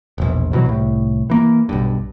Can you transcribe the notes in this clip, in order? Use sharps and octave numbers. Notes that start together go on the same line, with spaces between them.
E1 A#1
B2 E3 F#3
C2 A2
E3 A#3
B1 G2